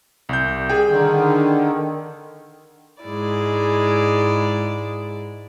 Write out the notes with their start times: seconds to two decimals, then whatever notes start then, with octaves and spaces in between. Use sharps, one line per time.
0.29 C2 G6
0.70 G#4 G5
0.90 D3 D#3
3.02 G#2 G#3 E4 D5